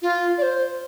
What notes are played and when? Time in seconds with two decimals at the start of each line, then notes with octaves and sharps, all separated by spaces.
0.02 F4
0.38 D5
0.42 C5